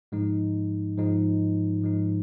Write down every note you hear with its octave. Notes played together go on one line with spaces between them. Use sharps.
G#2 F3 G#3 D#4
G#2 F3 G#3 D#4
G#2 F3 G#3 D#4